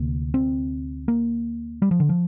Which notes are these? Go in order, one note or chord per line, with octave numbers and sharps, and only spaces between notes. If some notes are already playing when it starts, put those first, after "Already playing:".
Already playing: D2 C3 A#3
C4
A#3
G3
F3
D3
F3